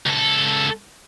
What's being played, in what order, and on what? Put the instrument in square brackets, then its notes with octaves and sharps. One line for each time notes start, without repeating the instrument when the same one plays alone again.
[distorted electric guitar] C#2 A4